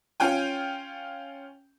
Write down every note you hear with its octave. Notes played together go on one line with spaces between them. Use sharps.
C#4 F4 G5 G#5